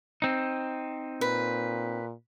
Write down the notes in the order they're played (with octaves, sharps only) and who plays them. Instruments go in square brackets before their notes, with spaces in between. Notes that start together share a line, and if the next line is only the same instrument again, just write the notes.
[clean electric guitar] C4 D#4
[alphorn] A#2 [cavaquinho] B4